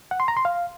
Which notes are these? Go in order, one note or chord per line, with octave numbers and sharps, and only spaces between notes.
F#5
C6
A#5
C6
F5